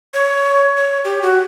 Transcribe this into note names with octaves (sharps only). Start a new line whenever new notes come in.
C#5
C#5
G4
F#4